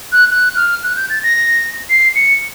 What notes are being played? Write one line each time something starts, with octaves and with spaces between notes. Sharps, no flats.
F#6
F#6
F6
F#6
G6
A6
A#6
C7
C#7